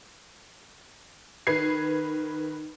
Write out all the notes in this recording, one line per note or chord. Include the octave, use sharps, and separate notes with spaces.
D#3 B4 G#6 C7